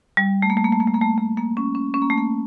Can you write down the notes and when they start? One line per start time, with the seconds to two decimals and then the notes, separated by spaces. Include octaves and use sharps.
0.17 G3
0.42 A3
0.50 A#3
0.57 A3
0.64 A#3
0.73 A3
0.80 A#3
0.88 A3
0.94 A#3
1.02 A3
1.18 A3
1.37 A#3
1.57 C#4
1.75 C#4
1.94 C#4
2.02 A#3
2.10 A3
2.18 A#3